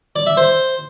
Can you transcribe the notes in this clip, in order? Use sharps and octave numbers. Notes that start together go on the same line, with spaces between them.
D5
E5
C5